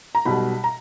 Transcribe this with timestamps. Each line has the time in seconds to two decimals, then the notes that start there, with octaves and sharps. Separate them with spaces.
0.15 A#5
0.25 B1 B2 G3 B5
0.64 A#5